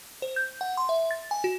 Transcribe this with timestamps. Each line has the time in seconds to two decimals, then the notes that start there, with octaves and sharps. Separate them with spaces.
0.22 C5
0.36 G6
0.61 F#5
0.77 C6
0.89 E5
1.11 A6
1.31 G#5
1.44 F#4